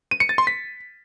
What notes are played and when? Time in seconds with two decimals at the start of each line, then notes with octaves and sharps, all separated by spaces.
0.11 D#7
0.20 C#7
0.29 A6
0.38 C6
0.47 B6